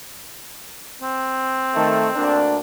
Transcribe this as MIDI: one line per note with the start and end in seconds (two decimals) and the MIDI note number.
1.02 2.41 60
1.75 2.08 51
1.75 2.08 57
2.16 2.57 38
2.16 2.57 58
2.16 2.57 62